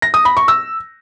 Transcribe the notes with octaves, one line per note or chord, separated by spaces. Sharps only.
A#6
D#6
B5
C#6
E6